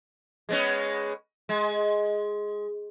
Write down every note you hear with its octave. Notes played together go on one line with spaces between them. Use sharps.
G#3 B3 C#4
G#3